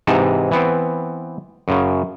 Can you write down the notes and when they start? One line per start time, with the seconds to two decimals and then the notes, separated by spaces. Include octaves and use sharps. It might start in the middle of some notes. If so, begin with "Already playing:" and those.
0.07 G#2 C3 E3 D#4 A5
0.51 E3 B3 C4
1.68 F#2 C#3